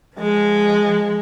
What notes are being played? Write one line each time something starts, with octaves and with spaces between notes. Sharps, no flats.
F3 G#3